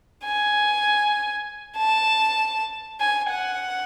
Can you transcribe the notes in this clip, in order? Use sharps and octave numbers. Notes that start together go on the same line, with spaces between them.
G#5
A5
G#5
F#5